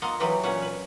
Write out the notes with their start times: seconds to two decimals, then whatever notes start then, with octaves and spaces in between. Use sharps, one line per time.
0.02 A#3 F4 D#5 F5 F#5
0.20 E3 F#3 G4 B4 D#5
0.43 A#2 C#4 B4 F#5
0.62 B4